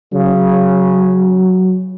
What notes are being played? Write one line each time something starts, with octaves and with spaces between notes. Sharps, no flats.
C#3 F#3